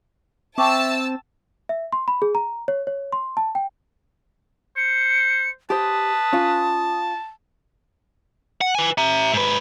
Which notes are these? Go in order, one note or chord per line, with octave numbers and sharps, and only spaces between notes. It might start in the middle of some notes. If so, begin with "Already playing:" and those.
C4 E5 G5 A5 C#6 D6 E6
E5
C6
B5
G#4
A#5
C#5
C#5
C6
A5
G5
C5 C#7
G4 B4 C5 A5 D#6
C#4 F4
F#5
B4 G#5
E5 A#5
G#2 B4